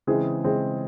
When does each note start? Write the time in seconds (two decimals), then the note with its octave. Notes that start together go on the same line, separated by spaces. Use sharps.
0.07 C#3 E3 G#3 C4 G#4
0.44 C#3 E3 G#3 C4